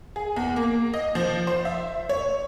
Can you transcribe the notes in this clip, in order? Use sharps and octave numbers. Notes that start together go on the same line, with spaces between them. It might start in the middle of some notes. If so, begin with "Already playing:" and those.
G#4
E2
A#3
D#5
F3
C5
E5
C#5